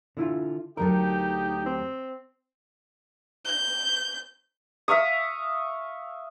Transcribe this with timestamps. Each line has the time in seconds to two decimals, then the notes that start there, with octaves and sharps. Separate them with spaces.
0.17 D3 E4 F4
0.77 D2 F#3 D#4 G4 A4 A#4
1.66 C4
3.45 G6
4.88 E5 F5 C#6 D#6